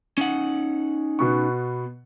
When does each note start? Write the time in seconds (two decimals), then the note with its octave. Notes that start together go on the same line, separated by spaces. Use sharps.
0.18 C#4 D#4 F#5
1.19 B2 B3 C#6